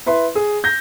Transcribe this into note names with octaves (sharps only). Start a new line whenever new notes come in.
E4 B4 E5 C6
G#4
G6 A#6